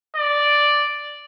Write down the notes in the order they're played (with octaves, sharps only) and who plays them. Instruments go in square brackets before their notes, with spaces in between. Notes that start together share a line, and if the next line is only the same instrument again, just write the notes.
[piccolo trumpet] D5